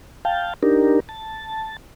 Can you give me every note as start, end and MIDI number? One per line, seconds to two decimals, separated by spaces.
0.25 0.54 77
0.25 0.54 79
0.25 0.54 81
0.63 1.00 62
0.63 1.00 63
0.63 1.00 67
0.63 1.00 70
1.09 1.77 81